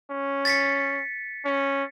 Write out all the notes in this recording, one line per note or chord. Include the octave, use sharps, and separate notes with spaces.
C#4
A6 B6 C#7
C#4